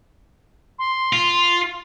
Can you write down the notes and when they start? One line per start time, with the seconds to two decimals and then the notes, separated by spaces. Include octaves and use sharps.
0.78 C6
1.13 F4